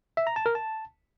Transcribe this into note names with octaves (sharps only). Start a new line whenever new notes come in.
E5
A#5
A5
A#4
A5